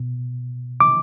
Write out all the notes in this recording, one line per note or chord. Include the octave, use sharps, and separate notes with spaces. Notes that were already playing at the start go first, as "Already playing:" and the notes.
Already playing: B2
D6